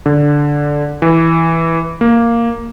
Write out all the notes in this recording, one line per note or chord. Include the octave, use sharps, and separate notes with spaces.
D3
E3
A#3